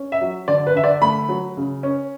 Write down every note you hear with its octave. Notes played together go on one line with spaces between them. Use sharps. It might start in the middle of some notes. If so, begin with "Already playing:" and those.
Already playing: C#4
E5
F#3
D3 D5
B4
D3 E5
D5
A3 B5
F#3
C#3
C#4